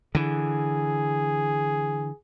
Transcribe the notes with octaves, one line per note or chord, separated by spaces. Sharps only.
D3 E3 G#4